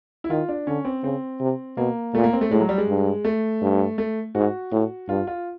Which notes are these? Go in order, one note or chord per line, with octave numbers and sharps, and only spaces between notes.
E4
D#3 F4
D4
D3 C#4
C4
C#3 C4
C3
B2 A#3
A#2 A3
A#3
C4
A3
A2 G#3
F#3
G3
G#3
G2
A3
G2
A3
G#2 F#4
A2
G2 F4
F4